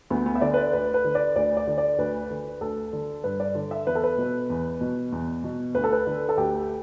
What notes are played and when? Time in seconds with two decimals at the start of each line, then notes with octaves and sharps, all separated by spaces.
0.10 D2 B3
0.26 B3
0.35 E5
0.41 D3 D5
0.54 B4
0.57 D5
0.73 D2 B4
0.94 B4
1.04 D3
1.15 D5
1.36 D2 D5
1.57 D5
1.67 D3
1.78 D5
1.98 D2 B4
2.30 D3
2.61 D2 A4
2.93 D3
3.24 G2 B4
3.40 D5
3.55 D3
3.71 E5
3.87 E2 B4
3.95 A4
4.04 B4
4.18 B2
4.50 E2
4.81 B2
5.12 E2
5.44 B2
5.75 D2 B4
5.84 A4
5.93 B4
6.07 D3
6.29 A4
6.37 D2 G4